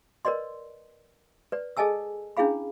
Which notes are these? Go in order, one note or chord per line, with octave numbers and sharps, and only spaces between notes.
A#4 B4 D5 D#5 C6
B4 D5
G#4 A4 D#5 G#5 A5 E6
C#4 D4 E4 G#4 F5 B5